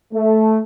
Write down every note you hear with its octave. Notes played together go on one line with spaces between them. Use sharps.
A3